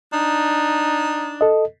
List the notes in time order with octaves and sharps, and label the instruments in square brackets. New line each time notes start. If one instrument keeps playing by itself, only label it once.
[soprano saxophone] D4 [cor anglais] D#4
[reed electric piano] A4 D#5